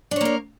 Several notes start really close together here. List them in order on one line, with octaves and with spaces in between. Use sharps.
D4 C#5 A#3 A#4